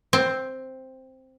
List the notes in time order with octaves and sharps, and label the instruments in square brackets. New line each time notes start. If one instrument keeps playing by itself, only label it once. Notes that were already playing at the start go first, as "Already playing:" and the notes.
[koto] C4